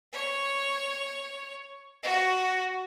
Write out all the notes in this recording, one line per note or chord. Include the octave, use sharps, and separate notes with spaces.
C#5
F#4